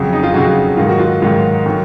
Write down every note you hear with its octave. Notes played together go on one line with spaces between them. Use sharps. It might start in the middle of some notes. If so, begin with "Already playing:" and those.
Already playing: F2 C#3 F#3
D#4
F4
F2 C#3 F#3 F#4
G#2 D#3 F#3 F4
F#4
F4
G#2 D#3 F#3 F4
D#3 F#3